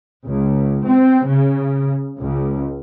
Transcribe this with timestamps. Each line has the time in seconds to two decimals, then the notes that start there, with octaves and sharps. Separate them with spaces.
0.26 C#2
0.86 C4
1.28 C#3
2.19 C#2